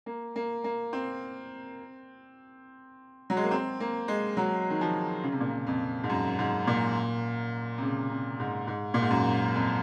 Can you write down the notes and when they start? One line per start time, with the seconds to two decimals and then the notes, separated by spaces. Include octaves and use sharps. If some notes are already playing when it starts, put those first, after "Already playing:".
0.06 A#3
0.36 A#3
0.64 A#3
0.93 C4
3.30 F#3
3.37 G#3
3.44 A#3
3.51 C4
3.80 A#3
4.08 G#3
4.37 F#3
4.70 D#3
4.81 F3
5.23 C#3
5.32 C3
5.40 A#2
5.50 C3
5.67 F2
6.04 G#2
6.10 F#2
6.39 G#2
6.67 A#2
7.78 C3
7.82 C#3
8.10 C3
8.40 G#2
8.67 G#2
8.94 A#2
9.02 G#2
9.11 F#2
9.55 F2